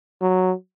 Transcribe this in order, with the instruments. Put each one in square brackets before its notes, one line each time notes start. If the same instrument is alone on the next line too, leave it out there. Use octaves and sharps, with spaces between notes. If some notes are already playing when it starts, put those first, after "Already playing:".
[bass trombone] F#3